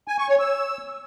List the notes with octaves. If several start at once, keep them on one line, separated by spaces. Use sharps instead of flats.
G#5
C#6
C#5
E6